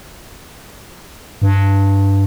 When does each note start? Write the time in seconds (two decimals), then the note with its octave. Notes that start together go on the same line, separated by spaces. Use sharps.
1.42 G2